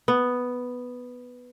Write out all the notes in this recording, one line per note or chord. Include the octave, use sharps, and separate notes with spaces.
B3